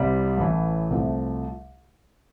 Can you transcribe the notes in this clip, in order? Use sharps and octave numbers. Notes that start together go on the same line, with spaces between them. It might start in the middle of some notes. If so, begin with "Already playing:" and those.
Already playing: C2 C3 G3
A1 A2 E3
C2 C3 F3 A3